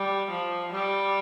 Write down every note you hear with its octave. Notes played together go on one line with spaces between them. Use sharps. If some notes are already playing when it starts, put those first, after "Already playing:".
Already playing: G3
F3
G3